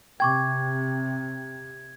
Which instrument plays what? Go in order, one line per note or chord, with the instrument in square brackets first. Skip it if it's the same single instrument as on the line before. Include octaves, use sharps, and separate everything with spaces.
[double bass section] C3 [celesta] G5 C#6 D6 [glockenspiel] G#6